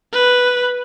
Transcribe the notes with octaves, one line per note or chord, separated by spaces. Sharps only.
B4